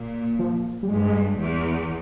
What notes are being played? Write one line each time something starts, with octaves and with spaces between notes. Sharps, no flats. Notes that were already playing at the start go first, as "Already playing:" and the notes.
Already playing: A#2
F3
G3
G2 G#3
E2